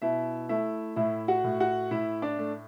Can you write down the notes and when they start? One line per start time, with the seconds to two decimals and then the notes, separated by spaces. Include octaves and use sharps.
0.02 B2 E4 E5
0.49 A3 E4 E5
0.96 A2 E4 E5
1.28 F#4 F#5
1.44 A2
1.60 F#4 F#5
1.91 A2 E4 E5
2.22 D4 D5
2.38 A3